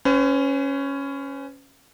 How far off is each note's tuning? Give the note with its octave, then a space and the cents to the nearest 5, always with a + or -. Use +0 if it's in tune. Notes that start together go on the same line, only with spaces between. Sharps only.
C#4 +0 B4 +45